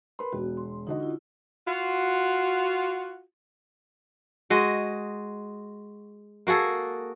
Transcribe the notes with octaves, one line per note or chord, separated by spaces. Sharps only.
A#4 B4 B5 C6
E1 B3 F#4
C6
D3 D#4 F#4 D#5
E4 F4
F4 F#4
G#3 F#4 D#5
A#3 F#4 G#4 A4